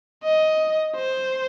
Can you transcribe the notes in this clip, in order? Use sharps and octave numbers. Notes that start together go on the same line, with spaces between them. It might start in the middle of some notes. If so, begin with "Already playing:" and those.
D#5
C5